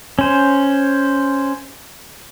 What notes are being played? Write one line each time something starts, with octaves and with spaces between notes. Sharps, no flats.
C#4 C5